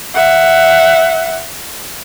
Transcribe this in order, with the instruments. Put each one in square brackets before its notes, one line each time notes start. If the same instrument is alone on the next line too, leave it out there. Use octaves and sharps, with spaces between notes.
[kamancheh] E5 F#5